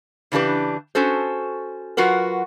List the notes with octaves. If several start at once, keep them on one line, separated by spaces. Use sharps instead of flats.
C#3 E3 D4 G4 B4
C#4 F#4 A4 C5
F#3 F4 F#4 A#4 B4